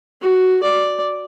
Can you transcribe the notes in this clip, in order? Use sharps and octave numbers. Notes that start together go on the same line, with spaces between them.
F#4
D5